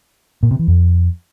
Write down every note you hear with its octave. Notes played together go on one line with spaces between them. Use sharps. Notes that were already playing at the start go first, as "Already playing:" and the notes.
A#2
C3
E3
F2